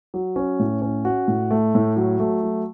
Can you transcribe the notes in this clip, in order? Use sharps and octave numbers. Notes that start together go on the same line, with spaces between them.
F#3
C#4
A2
C#4
F#4
A2
A3
A2
F#3
A3
F#3